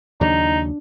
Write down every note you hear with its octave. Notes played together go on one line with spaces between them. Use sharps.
D#2 C#3 F#3 D4 D#4